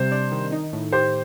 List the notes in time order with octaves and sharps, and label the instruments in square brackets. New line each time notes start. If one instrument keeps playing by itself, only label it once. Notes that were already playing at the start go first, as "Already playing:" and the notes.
Already playing: [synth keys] C3 G3 [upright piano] C5
[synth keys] D4
D#3
D#4
A2
[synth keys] G4 [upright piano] C5